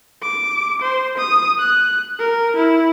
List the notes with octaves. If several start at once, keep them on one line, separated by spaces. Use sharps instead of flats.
D6
C5
D#6
F#6
A#4
E4